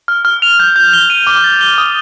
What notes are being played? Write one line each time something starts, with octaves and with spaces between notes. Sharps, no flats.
F6
F6
F7
G6
G6
G7
D#7
D6
A6
G7
D#6